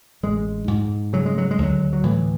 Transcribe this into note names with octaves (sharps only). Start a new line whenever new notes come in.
A1 G#3
G#2
C#3 F#3
G#3
F#3
G#3
D2 F#3
F#3
A2 E3